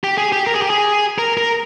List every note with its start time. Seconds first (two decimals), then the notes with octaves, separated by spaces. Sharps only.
0.04 G4
0.18 G#4
0.32 G4
0.47 A#4
0.54 G#4
0.62 G4
0.70 G#4
1.18 A#4
1.38 A#4